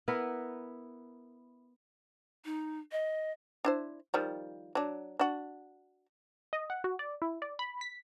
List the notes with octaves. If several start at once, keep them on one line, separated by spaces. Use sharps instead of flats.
B3 E4 A#4 B4
D#4
D#5
D4 E4 C5
D#3 F3 G3
F#3 D4
D4 F#4
D#5
F#5
F#4
D5
E4
D5
B5
B6